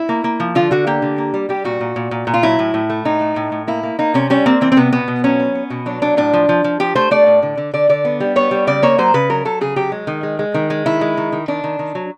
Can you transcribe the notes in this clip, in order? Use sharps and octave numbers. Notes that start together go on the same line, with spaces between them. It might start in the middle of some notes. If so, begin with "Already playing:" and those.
Already playing: E4
A#3
A#3
F3
D3 F4
D3 F#4
A#3 G4
D3
A#3
G3
G3 G4
A#2 F#4
A#2
A#2
A#2
A#2
F4
F#3 E4
A2
A2
A3
A2 D#4
A3
A2
A2
A#3 E4
A#3
A#3 D#4
C3 C#4
G3 C#4
A#3 C4
E3 C4
C4
C3 B3
B2 B3
B2
F#3 C#4
B3
B3
B2
F#3 D4
F#3 D4
A2 D4
F3
F3
F3
F3 G4
A3 C5
A3 D5
A2
D3
D3
D3 D5
D3 D5
B3
G3
B3 C#5
G3
C#3 D5
A#3 C#5
F#3 C5
C#3 B4
F#3 A#4
F#3 A4
C#3 G#4
F#3 G4
G#3
D#3
G#3
G#3
D#3
G#3
D#3 E4
G#3
D#3
D#3
D#3 D4
D#3
D#3
F#3